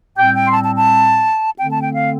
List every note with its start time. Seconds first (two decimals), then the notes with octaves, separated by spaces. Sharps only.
0.17 A2 G3 C4 G5
0.35 G5
0.48 C6
0.53 A5
0.65 A5
0.76 A5
1.58 D3 A3 C4 G5
1.71 A5
1.82 G5
1.93 F5